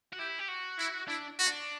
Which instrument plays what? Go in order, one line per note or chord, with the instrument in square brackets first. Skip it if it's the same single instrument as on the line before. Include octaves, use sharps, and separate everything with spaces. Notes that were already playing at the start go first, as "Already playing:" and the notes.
[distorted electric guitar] F#4
[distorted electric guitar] E4 [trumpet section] G4
[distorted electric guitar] G4
F#4
[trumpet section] E4
[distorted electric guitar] D4 [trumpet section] E4
[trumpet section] F#4
[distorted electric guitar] D4